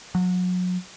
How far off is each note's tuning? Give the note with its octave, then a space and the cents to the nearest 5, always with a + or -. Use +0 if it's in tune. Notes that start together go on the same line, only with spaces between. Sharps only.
F#3 -30